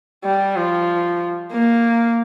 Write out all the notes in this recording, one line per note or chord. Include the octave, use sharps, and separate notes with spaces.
G3
F3
A#3